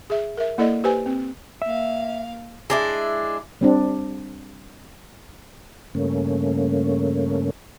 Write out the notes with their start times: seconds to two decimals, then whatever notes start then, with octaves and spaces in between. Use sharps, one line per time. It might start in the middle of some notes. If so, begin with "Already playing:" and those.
0.10 G#4 E5
0.37 A#4 E5
0.58 A#3 E4 A4 D5 D#5
0.84 G4 B4 C5 G#5
1.06 C4
1.62 A#3 E5 F5
2.70 G#3 D4 E4
3.61 G3 C4 D4
5.95 G2 C#3 A3 A#3 C#4